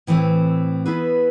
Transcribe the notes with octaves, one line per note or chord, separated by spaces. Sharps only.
A2 E3 A3 C4
B3 E4 G#4 B4 E5